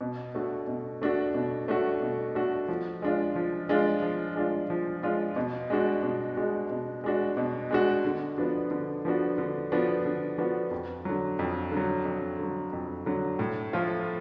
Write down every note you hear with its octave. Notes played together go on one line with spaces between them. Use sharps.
B2
A3 D4 F#4
B2
A3 D4 F#4
B2
A3 D4 F#4
B2
A3 D4 F#4
F3
G#3 D4 F4
F3
G#3 D4 F4
F3
G#3 D4 F4
F3
G#3 D4 F4
B2
G#3 D4 F#4
B2
G#3 D4 F#4
B2
G#3 D4 F#4
B2
G#3 D4 F#4
D3
F3 B3 D4 F#4
D3
F3 B3 D4 F#4
D3
F3 B3 D4 F#4
D3
F3 B3 D4 F#4
F2
D3 F#3
F2
D3 F#3
F2
D3 F#3
F2
D3 F#3
A2
F3 A3 F4